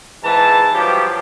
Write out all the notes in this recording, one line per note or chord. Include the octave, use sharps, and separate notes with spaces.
G#2 E3 A5
G2 F3 F#3 G4